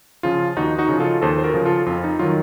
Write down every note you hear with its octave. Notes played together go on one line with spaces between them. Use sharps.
C#3 F3 F4
D#2 D#4 F#4
D#4 F#4
C#3 F3
F4 A4
D#2 A4 C5
C5
F#4 A#4
C#3 F3
F4 A4
F2 F4
D#4
D#3 F#3 F4